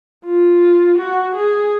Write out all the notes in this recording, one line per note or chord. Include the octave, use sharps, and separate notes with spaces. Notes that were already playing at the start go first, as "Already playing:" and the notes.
F4
F#4
G#4